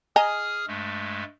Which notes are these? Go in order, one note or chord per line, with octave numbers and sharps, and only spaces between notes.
G#4 D#5 G#5 A#5 D#6 F6
G2 G#3 A3